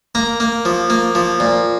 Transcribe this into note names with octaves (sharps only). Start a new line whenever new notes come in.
A#3 A#5
A#3
F3
A#3
F3
A#2